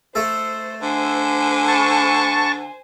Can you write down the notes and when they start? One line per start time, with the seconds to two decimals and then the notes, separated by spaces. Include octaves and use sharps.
0.15 A3 A4 C5
0.82 D3 C5 G#5
1.68 A5 C#6